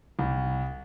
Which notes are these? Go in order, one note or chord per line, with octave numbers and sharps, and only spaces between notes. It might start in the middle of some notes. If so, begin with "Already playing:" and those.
C2